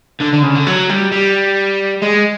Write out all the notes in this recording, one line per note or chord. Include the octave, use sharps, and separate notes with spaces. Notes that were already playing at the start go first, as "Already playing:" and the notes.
D3
D3
C#3
D3
F#3
G3
G3
G#3